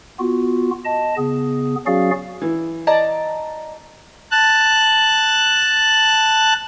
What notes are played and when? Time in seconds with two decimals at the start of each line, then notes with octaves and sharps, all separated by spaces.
0.19 B3 F4 F#4
0.85 D#5 A5
1.18 C#3 B3 G#4
1.86 F#3 C#4 F#4 G#4 D5 F5
2.42 E3
2.87 D5 D#5 A5 A#5
4.31 A5 F#6